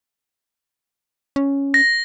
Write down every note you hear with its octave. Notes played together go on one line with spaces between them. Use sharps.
C#4
A#6